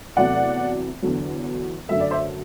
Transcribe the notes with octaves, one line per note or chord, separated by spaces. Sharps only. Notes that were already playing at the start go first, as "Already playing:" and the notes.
E2 C3 F#3 A3 D5 F#5
E2 D3 F#3
F#2 D3 F#3 A3 E5
D5
C5 E5